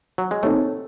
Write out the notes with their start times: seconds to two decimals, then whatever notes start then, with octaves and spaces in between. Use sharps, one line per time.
0.18 F#3
0.31 G#3
0.43 A2 A3 C4 D#4 A4 C#5